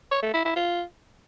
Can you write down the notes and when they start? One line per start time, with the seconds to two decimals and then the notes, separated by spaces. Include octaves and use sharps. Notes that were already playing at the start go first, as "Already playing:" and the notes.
0.12 C#5
0.23 A3
0.34 E4
0.45 E4
0.56 F4